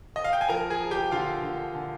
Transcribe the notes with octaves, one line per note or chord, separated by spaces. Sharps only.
D#5
F5
G5
G#5
F3 A#4 A#5
G#4 G#5
F3
G4 G5
D3 F4 F5
D3
D3